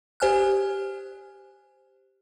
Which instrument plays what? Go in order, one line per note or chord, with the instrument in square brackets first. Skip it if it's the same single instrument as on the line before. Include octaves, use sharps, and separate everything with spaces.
[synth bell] G4 C5 G#5 F6 F#6